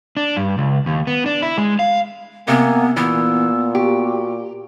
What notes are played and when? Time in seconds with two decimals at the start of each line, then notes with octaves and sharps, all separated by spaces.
0.17 D4
0.37 G2
0.58 C#2
0.86 D#2
1.07 B3
1.26 D4
1.42 E4
1.58 G#3
1.79 F5
2.48 C3 A#3 B3 G#5
2.96 A#2 E3 B3 E6
3.75 F#4 G4